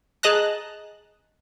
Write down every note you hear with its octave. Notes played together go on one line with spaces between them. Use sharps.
G#4 D#5 A5 A#5 F#6